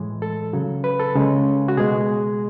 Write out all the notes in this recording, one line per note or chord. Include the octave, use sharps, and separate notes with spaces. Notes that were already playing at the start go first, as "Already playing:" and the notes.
Already playing: A2 E3 G#3
A4
C#3 F#3
B4
A4
C#3 G#3
F#4
B2 G#3 G#4